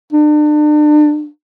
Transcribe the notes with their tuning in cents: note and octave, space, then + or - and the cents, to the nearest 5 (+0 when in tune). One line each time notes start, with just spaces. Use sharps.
D4 +35